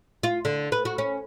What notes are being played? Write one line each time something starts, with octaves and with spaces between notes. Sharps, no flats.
F4
D3
B4
F#4
C#4